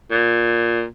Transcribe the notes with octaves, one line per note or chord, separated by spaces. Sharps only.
A#2